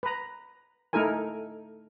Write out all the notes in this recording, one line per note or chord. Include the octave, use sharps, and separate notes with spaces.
B4 A#5
A3 D#4 E4 A4 A#4 G#5